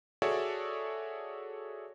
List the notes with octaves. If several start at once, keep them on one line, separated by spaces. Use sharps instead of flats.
F#4 G#4 A4 C#5 D5 E5